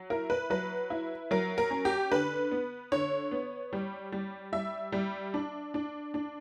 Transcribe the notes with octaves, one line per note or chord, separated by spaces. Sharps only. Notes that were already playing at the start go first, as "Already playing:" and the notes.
Already playing: F#3
E4 A#4
B4
F#3 B4
E4
F#3 A#4
A#4
C#4
G4
D3 B4
B3
D3 C#5
B3
G3
G3
G3 E5
G3
D4
D4
D4